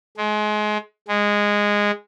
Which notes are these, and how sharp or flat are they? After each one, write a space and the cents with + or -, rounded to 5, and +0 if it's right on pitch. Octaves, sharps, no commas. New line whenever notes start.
G#3 +30
G#3 -10